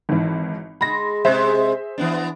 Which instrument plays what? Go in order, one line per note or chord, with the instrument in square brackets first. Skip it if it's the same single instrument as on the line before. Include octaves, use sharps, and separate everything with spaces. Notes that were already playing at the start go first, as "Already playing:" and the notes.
[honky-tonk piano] G#1 E3
[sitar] G#3 [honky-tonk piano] B5 A#6
[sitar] C3 G#3 [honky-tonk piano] G#4 C5 E5
[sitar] E3 B3 D4